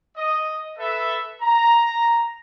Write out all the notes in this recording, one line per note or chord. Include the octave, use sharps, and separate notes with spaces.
D#5
A4 B4 E5
A#5